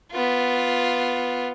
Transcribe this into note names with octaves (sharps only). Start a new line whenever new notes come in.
B3 F4